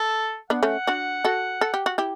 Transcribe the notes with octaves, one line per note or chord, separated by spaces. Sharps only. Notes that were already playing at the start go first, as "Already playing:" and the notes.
Already playing: A4
B3 D4 F#5
A3 C#4
D4 F#4
F#4 A4
A4
G4
F#4
E4 G4